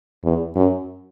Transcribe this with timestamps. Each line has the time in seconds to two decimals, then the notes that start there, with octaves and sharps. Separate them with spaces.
0.23 E2
0.56 F#2